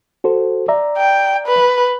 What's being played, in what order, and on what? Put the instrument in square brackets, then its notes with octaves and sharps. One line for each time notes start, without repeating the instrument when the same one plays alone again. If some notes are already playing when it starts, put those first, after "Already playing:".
[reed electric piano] F#4 A4 C5
D5 E5 A#5
[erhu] G5
B4